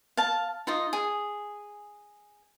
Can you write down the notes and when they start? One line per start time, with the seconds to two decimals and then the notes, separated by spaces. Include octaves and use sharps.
0.17 F5 A5
0.67 D#4 F4 D#5
0.93 G#4